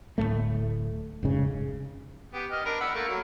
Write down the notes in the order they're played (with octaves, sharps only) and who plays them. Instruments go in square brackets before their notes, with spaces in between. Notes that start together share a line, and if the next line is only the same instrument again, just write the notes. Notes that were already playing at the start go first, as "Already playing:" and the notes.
[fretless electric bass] D1 F2 A2 A3
F1 G#2 C#3
[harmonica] B3 G4
D#5 F6
D4 A#4 B5
F#5 B5 E6
A3 A#3
F#3